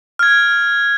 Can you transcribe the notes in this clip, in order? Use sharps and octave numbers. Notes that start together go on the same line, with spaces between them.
F6 G#6